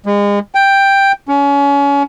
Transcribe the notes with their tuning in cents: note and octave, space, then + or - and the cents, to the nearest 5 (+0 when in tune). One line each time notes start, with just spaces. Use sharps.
G#3 -35
G5 +5
C#4 +30